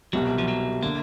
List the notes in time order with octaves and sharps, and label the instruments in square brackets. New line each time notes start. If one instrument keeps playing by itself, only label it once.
[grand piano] C2 B2 G3 [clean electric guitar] F#3
[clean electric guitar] F3
F#3
[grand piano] D3 [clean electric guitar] A#3